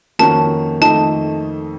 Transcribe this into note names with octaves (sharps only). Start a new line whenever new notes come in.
F2 D#3 A#3 C#4 F#4 A5
F2 D#3 A3 D#4 A5